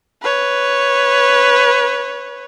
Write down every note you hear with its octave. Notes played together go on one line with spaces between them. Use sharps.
B4 C#5